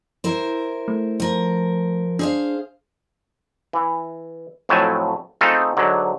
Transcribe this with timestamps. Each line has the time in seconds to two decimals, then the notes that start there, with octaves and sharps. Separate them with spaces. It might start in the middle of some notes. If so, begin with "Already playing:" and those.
0.24 E4 A#4 C5
0.88 A3
1.20 F3 A#4
2.19 D4 G#4 C5 F5
3.73 E3
4.69 F2 A2 F#3 A3 G#5 A5
5.41 A3 C4 D#4 F4 G#4 A4
5.77 G#2 D3 F#3